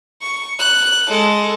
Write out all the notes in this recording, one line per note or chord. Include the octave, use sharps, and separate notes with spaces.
C#6
F#6
G#3 A4